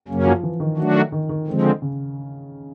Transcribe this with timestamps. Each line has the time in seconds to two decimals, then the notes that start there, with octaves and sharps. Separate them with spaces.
0.08 F#2 C#3 F#3 A#3 C#4
0.26 F3
0.43 E3
0.60 D#3
0.77 D#3 F#3 A3 D4 F#4
1.12 D#3
1.29 D#3
1.47 D3 F3 G#3 C4
1.82 C#3